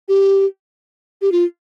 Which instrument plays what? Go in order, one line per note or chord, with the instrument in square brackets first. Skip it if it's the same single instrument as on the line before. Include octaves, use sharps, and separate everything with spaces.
[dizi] G4
G4
F4